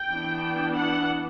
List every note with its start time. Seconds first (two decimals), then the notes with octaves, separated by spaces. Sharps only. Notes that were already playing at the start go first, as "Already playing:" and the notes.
Already playing: G5
0.09 E3 B3 D4
0.76 F#5